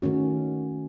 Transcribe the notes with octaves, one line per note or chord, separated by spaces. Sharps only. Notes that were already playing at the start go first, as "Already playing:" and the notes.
D#3 A3 C#4 F#4